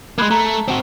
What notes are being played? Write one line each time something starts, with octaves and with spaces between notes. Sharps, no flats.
G#3 A#3 B5 F#6 G#6
A3 A#5
A5
C4 F#4